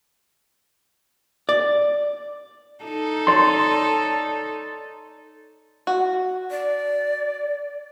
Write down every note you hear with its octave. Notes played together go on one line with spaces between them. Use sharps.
D5
D#4 A4
C#5 D5 C6
F#4
D5